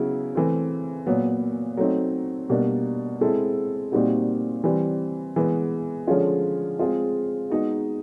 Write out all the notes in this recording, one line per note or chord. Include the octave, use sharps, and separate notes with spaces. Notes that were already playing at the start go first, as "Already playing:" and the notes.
Already playing: C#3 F#3 B3 E4
E3 A3 C4
A#2 F#3 B3
F#3 A3 C4 D#4
B2 G3 A#3 D4
G#3 C4 E4 A4
A#2 G3 C4 D#4 F#4
E3 G3 C4
E3 G#3 B3
D3 F3 G#3 C#4 F4
G#3 C4 F4 G#4
G#3 B3 D#4 F#4